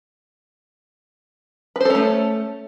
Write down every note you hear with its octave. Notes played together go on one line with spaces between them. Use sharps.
A3 C#4 A4 B4 C5